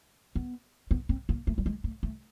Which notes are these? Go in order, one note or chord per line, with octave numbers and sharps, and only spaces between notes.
B3
B3
C4
A#3
A3
G3
G#3
A3
A3